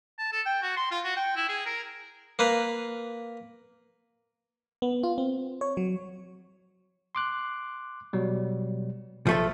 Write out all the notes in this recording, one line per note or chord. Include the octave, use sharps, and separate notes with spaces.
A5
A4
G5
F#4
C6
F4
F#4
G5
E4
G#4
A#4
A#3 B4 F5
B3
F4
C4
C#5
F#3
C6 D6 F#6
B2 F#3 G3
B1 F3 A3 A4